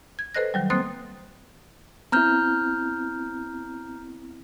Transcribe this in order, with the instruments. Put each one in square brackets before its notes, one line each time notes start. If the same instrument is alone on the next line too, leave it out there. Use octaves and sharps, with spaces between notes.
[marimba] G#6
A4 B4 C5 D#5 F#6 A#6
D#3 F#3 G3
A#3 C4 C5 D#6 F#6 A6
[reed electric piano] B3 C4 E4 [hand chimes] A#5 F6 G6